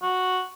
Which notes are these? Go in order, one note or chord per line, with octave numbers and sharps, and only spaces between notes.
F#4